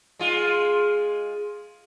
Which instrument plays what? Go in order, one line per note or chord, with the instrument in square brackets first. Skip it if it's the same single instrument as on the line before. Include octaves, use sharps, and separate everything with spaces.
[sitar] G#3 F4